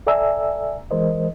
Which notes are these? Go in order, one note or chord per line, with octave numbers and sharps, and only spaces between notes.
A4 D5 E5 G#5 A#5 E6
E3 G#3 A#4 C5 D#5